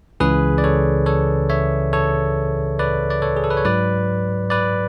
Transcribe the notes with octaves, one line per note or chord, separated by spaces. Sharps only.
C#2 C#3 E3 G#4 B4
D5
A4 C#5
A4 C#5
C#5 E5
A4 C#5
B4 D5
D5
A4 C#5
G#4
A4
B4
C#5
G#2 F#3 B4 D5
B4 D5